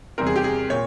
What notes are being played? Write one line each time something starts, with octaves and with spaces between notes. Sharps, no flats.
E2 C3 G3 C4 A#4
G#4
G4
G#4
A#2 C#5